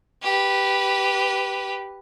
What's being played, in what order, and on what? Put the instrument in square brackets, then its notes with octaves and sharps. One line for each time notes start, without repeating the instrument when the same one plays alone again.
[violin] G4 B4